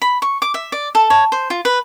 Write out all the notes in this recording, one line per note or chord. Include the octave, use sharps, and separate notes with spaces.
B5
C#6
D6
E5
D5
A4
C#5
C5
F4
B4